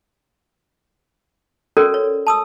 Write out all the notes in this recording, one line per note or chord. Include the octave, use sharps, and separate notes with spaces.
C#4 F#4 A4 A#4 D5
C#5
A5 D#6 E6